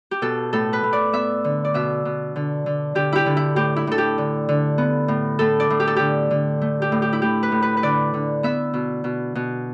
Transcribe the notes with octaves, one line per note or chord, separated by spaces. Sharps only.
G4
B2 A4
A2 A4
B4
A2
D5
B3 E5
D3
D5
B2 E5
B2
D3
D3
D3 G4
E4 G4
D3
E4
A2 G4
E4
A2 A4
G4
D3
D3
B3
A2
A2 A4
D5
A2
G4
A4
D3 G4
D3
A3
G4
A2
G4
E4
A3 G4
B4
A2
B4
B4
D3 D5
D3
B3 E5
B2
B2
B2